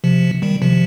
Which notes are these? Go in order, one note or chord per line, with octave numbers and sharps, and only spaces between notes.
C3 F3
D#3 G3
C3 F3